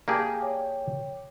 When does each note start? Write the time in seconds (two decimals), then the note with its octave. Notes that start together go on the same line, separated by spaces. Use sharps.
0.08 A#3 G4 G#4 D5 G#5 A5
0.40 C#5 G5 D6